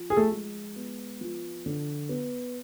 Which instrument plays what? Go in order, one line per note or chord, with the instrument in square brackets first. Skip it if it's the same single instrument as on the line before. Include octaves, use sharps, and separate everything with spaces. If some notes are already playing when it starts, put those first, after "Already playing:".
Already playing: [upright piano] F3
[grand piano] G#4
A3 A4
[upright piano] G#3
B3
F3
D3
B3